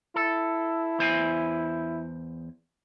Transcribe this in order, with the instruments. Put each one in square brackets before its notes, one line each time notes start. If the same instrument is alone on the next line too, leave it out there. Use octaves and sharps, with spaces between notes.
[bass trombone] E4 [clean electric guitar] A4
[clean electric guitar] E2 C5 G#5